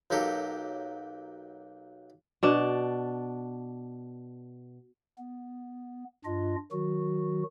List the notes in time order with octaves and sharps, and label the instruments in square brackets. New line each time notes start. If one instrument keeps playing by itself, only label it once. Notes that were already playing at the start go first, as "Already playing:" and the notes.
[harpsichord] B1 F#3 A#3 G4 A4
[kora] B2 D4
[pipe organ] B3
G2 D4 F4 D#5
D#3 F#3 F#4